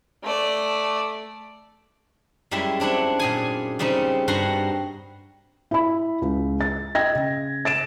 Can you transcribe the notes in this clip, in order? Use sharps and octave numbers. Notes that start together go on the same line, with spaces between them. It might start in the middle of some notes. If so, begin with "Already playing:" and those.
A3 D5
F#2 G3 G#3 E4 E5
C4 D4 E4 F#5
A#2 G#4 G#5
C#3 G3 C4 C#4 D#4
G2 G3 F#4 F#5 A#5 C6
E4 B5
C#2
A6
D#5 G5 G#6 A#6
C#3
A6 D7 E7